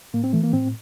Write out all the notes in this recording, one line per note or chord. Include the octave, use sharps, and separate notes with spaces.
A2 A#3
C4
E3 A3
A#3
A2 C4